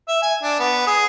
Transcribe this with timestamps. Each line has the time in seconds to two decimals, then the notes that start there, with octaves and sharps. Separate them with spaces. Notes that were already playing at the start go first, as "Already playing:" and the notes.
0.08 E5
0.22 G#5
0.42 D4
0.59 B3
0.87 G#4